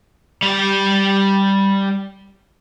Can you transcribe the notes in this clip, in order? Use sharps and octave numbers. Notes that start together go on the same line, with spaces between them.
G3 D5